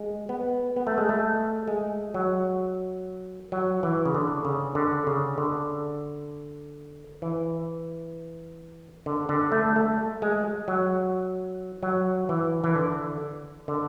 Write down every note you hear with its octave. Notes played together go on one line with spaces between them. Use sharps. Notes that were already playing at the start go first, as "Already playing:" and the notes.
Already playing: G#3
B3
B3
A3
G#3
A3
G#3
F#3
F#3
E3
C#3
D3
C#3
D3
C#3
D3
E3
D3
D3
A3
A3
G#3
F#3
F#3
E3
E3
D3
D3